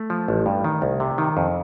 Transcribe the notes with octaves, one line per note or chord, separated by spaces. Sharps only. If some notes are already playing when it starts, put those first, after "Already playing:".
Already playing: A3
F3
A1
G2
D#3
C2
C3
D#3
F2